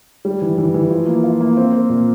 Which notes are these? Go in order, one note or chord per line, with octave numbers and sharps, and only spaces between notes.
G3
E3
E3
E3
F3
A#3
F4
A#3
C4
C4
A#2